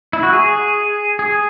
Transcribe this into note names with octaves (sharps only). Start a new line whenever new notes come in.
E4
F#4
G#4
G#4